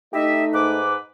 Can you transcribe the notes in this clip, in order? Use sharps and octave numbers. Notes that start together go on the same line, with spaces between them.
A3 D#4 G4 D#5 E5
G#2 B4 D6